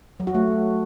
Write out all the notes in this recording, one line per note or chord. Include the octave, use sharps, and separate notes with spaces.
F#3
F#4
A3